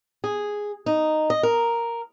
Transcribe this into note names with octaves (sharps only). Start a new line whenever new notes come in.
G#4
D#4
D#5
A#4